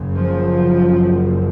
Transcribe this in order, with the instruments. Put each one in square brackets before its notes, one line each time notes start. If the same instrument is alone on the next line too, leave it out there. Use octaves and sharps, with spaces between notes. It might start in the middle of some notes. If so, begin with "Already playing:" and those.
Already playing: [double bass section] F#1 F#2 C#3
F3